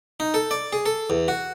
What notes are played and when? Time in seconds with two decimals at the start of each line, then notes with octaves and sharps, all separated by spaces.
0.20 D#4
0.34 A4
0.51 D5
0.73 G#4
0.86 A4
1.10 E2
1.28 F#4